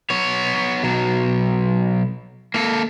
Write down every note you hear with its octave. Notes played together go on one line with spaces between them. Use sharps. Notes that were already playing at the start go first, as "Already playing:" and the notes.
B3 C#5
B1 F#3
A#3 A4